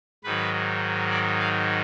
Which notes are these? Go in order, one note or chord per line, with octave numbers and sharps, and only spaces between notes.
G#2 D#3 F#3 B4
D5
F5